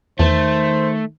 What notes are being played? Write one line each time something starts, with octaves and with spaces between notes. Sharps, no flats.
E2 D#3 A3 C5